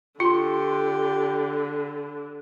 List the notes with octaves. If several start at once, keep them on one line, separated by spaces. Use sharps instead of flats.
D3 F4 G4 A#5 C6